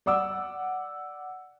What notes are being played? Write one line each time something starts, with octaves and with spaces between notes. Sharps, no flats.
D5 F#5 D6 E6